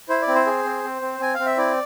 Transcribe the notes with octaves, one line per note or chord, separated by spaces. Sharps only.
E4 C5
D5
C4
C5
G#4
C4
C4
C4
C4 G#5
C4 F5
E5
E4 D5